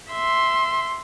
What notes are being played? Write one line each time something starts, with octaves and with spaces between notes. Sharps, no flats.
E5 C6